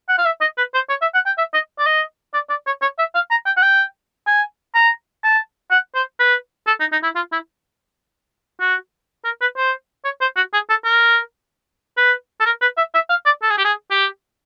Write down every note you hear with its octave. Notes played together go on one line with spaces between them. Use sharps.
F#5
F5
E5
D#5
B4
C5
C#5
E5
F#5
G5
E5
D#5
D5
D#5
D5
D5
C#5
C#5
E5
F5
A#5
G5
F#5
G5
G#5
A#5
A5
F#5
C5
B4
A4
D#4
D#4
E4
F4
E4
F#4
A#4
B4
C5
C#5
C5
F#4
G#4
A4
A#4
B4
A4
A#4
B4
E5
E5
F5
D5
A4
G#4
G4
G#4
G4